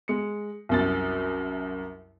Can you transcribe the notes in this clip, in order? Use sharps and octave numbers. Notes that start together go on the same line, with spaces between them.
G#3 C#7
C2 F#2 A6